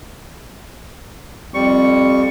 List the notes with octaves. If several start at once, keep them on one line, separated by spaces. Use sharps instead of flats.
F2 G3 C#6